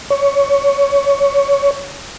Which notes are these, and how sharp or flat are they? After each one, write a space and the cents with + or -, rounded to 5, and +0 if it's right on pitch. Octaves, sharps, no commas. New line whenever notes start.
C#5 +15